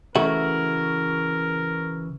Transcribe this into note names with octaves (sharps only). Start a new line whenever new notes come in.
C#3 E3 A3 F#4 A#4